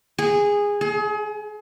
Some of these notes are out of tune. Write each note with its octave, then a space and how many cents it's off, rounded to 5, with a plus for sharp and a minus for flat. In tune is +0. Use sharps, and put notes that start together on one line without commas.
G#4 -15
G#4 +35